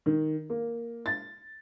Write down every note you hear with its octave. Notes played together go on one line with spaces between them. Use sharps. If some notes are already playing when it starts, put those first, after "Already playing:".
D#3
A#3
A6